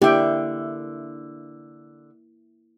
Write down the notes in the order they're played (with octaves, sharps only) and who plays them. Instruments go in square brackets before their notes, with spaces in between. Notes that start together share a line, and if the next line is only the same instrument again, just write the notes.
[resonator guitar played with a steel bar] D3 E5 [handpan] A#3 E4 [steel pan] G4 G5